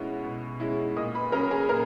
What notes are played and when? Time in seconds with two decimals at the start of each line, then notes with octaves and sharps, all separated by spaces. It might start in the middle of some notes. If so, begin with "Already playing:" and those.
Already playing: B2 G#3 C#4 E4 F#5
0.24 B2
0.60 G#3 C#4 E4
0.96 A#2 D#5 D#6
1.15 B4 B5
1.32 F#3 C#4 A#4 A#5
1.51 G#4 G#5
1.69 A#2 A#4 A#5